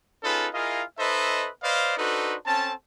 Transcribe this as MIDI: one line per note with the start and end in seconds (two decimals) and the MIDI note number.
0.23 0.47 61
0.23 0.47 63
0.23 0.47 65
0.23 0.47 68
0.23 0.47 69
0.23 0.47 71
0.53 0.83 64
0.53 0.83 65
0.53 0.83 68
0.53 0.83 70
0.53 0.83 75
0.53 0.83 77
0.99 1.48 63
0.99 1.48 69
0.99 1.48 71
0.99 1.48 72
0.99 1.48 75
0.99 1.48 76
1.63 1.94 71
1.63 1.94 72
1.63 1.94 74
1.63 1.94 75
1.63 1.94 77
1.98 2.35 62
1.98 2.35 63
1.98 2.35 66
1.98 2.35 69
1.98 2.35 71
1.98 2.35 72
2.46 2.72 60
2.46 2.72 61
2.46 2.72 69
2.46 2.72 81